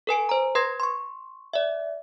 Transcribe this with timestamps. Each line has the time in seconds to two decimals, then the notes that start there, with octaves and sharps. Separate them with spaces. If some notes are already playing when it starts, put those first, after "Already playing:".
0.07 A4 B4 G#5 D7
0.29 C5 A#5
0.55 B4 C6 G#6 A#6
0.80 C6 C#6
1.53 D5 E5